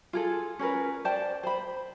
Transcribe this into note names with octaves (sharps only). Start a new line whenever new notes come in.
F4 G#4 A4
C#4 G#4 A#4 B4
C5 D5 G5 A5
C5 B5